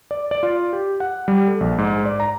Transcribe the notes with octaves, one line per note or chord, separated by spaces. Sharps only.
D5
D5
F4
G4
F#5
G3
A4
A#1
G#2
D5
A#5